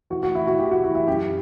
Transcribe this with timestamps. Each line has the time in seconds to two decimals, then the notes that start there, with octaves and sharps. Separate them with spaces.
0.10 E3 F#4
0.23 F#4
0.35 E3 E4
0.47 F#4
0.58 E3 G4
0.71 F#4
0.83 E3 E4
0.95 E4
1.07 F#2 G4